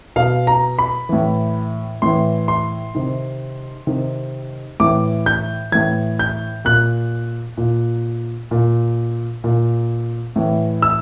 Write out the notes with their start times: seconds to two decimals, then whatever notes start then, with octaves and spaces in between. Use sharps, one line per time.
0.16 B2 F5
0.47 A#5
0.79 B5
1.09 A2 E3
2.02 A2 E3 C6
2.48 C6
2.95 C3 D#3
3.87 C3 D#3
4.80 A2 E3 D6
5.26 G6
5.72 A2 E3 G#6
6.19 G6
6.65 A#2 F#6
7.57 A#2
8.51 A#2
9.44 A#2
10.36 A2 E3
10.82 E6